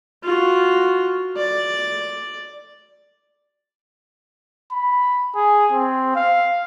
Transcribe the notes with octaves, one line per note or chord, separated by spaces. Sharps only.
F4 F#4
D5
B5
G#4
C4
F5